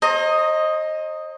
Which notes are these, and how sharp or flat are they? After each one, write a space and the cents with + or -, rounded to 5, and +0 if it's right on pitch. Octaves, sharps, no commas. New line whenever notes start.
C5 +35 D#5 +0 A#5 -20